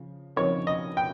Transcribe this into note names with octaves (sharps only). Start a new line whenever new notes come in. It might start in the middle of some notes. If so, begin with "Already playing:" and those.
Already playing: C#3 F3
C#3 F3 C4 D#4 A#4 C#5
D#5
G5